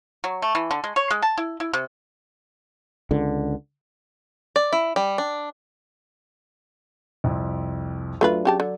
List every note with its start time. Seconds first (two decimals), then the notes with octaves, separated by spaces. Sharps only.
0.24 F#3
0.42 A3
0.55 E3
0.71 D3
0.84 G#3
0.96 C#5
1.10 G#3
1.22 A5
1.38 E4
1.60 E4
1.73 C3
3.11 C#2 D3
4.56 D5
4.73 E4
4.96 G3
5.18 D4
7.24 C2 F2
8.21 F#3 A3 D4 F4 B4
8.45 C#3 G4 A5
8.60 D3